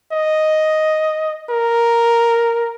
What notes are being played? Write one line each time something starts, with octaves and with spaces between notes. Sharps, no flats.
D#5
A#4